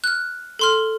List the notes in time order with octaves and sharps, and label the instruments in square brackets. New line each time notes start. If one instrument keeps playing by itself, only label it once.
[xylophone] F6 F#6
A4 C6 F6